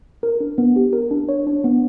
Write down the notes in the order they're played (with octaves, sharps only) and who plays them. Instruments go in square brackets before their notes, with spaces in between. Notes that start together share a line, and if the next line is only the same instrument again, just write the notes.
[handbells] A#4
D4
B3
G4
A#4
D4
C#5
D4
B3